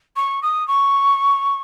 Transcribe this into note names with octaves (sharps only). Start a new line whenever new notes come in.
C#6
D#6
C#6